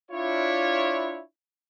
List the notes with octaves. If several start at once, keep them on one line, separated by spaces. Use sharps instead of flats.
D4 E4 F4 C#5